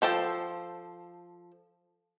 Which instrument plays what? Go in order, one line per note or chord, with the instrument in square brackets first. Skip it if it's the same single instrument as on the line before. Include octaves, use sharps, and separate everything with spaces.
[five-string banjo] F3 A4 C5 G5